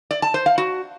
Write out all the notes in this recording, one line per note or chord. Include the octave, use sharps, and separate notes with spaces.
D5
A5
C5
F5
F#4